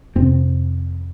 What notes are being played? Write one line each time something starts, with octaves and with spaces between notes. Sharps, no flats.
F2 C3 C4